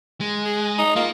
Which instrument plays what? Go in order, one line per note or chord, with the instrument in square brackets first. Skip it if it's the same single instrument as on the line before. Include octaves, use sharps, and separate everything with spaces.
[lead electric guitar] G#3
[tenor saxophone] G#4
D#4
[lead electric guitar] A#3 A#4 [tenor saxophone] F4